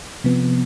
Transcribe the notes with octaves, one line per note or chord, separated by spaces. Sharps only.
C3 F3 B3